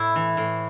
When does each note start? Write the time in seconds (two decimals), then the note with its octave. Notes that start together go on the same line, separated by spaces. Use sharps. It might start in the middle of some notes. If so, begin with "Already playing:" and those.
Already playing: A2 E4
0.16 E3
0.37 A2